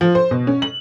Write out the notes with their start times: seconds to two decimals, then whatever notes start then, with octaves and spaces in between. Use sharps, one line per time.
0.01 F3
0.15 C5
0.31 B2
0.47 C#4
0.62 F#7